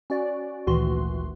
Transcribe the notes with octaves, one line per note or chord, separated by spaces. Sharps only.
C#4 F#4 D5
G#1 D2 A#2 E3 F#4 C6